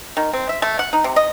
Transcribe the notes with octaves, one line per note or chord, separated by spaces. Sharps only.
D#3
C4
E5
A3
F#5
D#4
C3
D#5